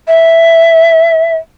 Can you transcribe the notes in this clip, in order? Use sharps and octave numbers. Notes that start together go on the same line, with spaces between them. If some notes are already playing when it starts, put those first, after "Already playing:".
E5